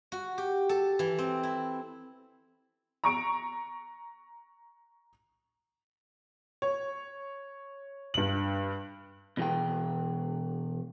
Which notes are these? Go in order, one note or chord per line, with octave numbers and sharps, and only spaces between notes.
F#4
G4
A4
E3
C4
E4
A#5 C#6 D7
C#5
G2 F#7
B2 E3 G#4 G5